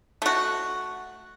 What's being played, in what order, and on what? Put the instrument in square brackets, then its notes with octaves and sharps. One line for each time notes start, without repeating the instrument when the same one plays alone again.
[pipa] A3 F#4